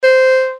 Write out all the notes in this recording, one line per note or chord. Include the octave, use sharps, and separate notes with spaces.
C5